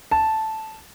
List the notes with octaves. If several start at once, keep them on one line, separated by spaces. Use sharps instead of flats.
A5